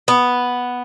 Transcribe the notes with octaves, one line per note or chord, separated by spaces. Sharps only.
B3